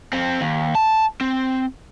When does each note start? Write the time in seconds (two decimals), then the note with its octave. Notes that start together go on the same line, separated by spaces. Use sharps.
0.13 F2 C4
0.41 D#2
0.75 A5
1.21 C4